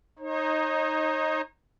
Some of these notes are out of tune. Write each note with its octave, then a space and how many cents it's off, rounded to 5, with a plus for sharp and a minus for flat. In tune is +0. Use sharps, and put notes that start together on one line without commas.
D#4 +0 C#5 -45